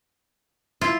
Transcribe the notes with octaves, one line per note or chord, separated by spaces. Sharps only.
E4 F4